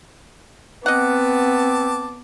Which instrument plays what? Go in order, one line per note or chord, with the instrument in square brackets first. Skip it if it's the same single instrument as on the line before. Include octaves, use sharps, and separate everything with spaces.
[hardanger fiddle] B3 [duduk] C4 [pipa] D#5 F#5 [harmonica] A5 D6